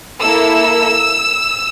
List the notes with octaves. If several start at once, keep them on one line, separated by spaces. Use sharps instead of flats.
A#3 E4 A4 E6